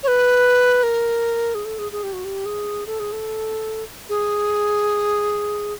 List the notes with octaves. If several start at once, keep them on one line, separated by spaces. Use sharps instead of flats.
C#5
B4
A#4
G#4
A4
G#4
G#4
G4
F#4
G4
G#4
A4
G#4
A4
G#4